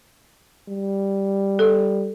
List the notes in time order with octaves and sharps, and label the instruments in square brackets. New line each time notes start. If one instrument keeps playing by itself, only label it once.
[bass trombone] G3
[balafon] A4